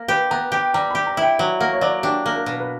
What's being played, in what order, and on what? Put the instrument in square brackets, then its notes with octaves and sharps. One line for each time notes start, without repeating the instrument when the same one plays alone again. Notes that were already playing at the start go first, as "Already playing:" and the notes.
Already playing: [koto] A#3
[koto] G4 [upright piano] B4
[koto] B3 [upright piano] A#5
[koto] G4 [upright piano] G5
[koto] G3 [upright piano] A#5
[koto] G4 [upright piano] B5
[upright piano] A#5
[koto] E4
[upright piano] G5
[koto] F#3
[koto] A#3 [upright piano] F#5
[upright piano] C#5
[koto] F#3 [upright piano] D5
[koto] D4 [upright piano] G4
[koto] A#3
[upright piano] A#4
[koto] B2
[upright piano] B4